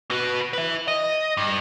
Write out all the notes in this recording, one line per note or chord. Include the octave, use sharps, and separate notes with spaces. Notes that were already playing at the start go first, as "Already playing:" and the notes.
F#4 B4
B4 E5
D#5
G2